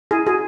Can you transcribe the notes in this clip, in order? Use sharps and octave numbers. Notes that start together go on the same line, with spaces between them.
E4 G#4
F#4 G#4